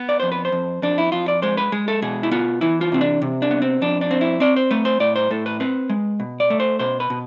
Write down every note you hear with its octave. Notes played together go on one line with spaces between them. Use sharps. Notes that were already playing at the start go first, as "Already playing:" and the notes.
Already playing: B3
D5
F2 C5
B4
C5
F2
F2 D4
E4
F2 F4
D5
G#3 C5
B4
G#3 G#4
A4
B2 G#4
E4
B3 F4
E3 E4
F4
C3 C4
D4
C3
D4
B3
C4
F2 D4
D4
C4
E4
C4 D5
C5
A3 B4
C5
A2 D5
C5
A2 A4
B4
C4 B4
G#3
B2
D5
A3
C5
B2 C5
B4
B2